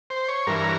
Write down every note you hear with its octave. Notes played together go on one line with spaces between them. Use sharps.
C5
C#5
G2 E3 A#4